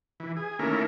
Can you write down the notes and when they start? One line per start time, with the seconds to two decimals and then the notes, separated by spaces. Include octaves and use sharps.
0.20 E3
0.36 G#4
0.59 D#3 A3 A#3 C#4 E4 A#4